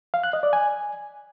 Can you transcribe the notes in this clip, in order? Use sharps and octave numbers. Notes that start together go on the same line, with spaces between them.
F5
F#6
D#5
D5
G#5